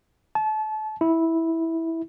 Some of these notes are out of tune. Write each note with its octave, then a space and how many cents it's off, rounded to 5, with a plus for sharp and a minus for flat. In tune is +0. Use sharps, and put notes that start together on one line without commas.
A5 -30
E4 -10